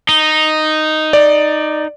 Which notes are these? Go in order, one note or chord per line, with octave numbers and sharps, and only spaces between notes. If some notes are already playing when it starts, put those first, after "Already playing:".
D#4
D5